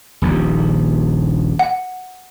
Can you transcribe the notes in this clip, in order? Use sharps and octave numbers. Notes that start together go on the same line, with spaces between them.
D#1 A#1 D#2
F#5